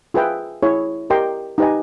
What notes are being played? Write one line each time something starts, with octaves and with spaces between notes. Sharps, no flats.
F4 G#4 B4 E5 G5
E4 G#4 C#5
G4 A#4 D#5 G5 C6
D#4 G4 B4 D#5 G#5